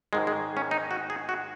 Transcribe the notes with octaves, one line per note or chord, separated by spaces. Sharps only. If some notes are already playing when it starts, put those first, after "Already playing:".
G#2 D#3 G#3
G#3
C#4
D#4
F#4
G#4
F#4